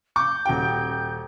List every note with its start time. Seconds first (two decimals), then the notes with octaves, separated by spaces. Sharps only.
0.16 C#6 D6 G6
0.46 D#1 F#4 G5